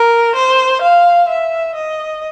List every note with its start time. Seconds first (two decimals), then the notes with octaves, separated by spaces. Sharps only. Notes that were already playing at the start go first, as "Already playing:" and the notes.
Already playing: A#4
0.35 C5
0.81 F5
1.28 E5
1.75 D#5